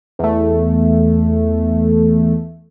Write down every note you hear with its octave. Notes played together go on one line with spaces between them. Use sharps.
E2 A3